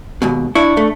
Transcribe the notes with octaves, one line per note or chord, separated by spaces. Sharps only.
D#2 G#2 B2
D4 E4 C#6
A3